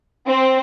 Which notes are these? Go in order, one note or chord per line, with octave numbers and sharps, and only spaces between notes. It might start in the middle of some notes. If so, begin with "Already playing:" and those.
C4